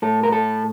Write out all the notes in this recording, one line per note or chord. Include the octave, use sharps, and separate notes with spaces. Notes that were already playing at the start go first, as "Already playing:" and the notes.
A2 A4
A#4
A4